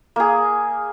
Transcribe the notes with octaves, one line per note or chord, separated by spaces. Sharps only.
A#3 G#4